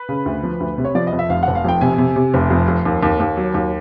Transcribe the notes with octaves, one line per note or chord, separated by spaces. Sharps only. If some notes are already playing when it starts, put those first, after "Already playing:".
Already playing: B4
C#3
D2
F3
D2
C3
C#5
F3 D5
D#5
F2
E5
F1 F5
F1 F#5
F5
F2 G5
C3 G#5
C3
C3
F1
F2
F2
D#2
D#2
D#2
F#3
D#2